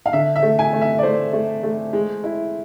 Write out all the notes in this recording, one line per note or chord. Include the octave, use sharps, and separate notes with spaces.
F5
D3 E5
E5
A3
G#5
A3
E5
D5
A3 C5
A3
A3
G#3
E4